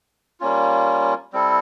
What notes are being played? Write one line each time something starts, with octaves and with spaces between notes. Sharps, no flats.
G3 A#3 C#4 F4
G3 C4 E4 A4